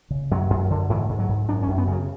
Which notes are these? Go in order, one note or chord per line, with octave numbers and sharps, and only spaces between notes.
C#3
F#2 F#3
F#2
D3
G#2 E3
G#2
F#3
G#2
F#2 D4
C#4
F#2
B3
C#3 F#3